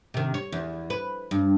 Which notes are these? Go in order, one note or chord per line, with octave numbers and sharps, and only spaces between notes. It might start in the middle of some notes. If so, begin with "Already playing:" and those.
C3 D#3
C#5
E2
B4
G2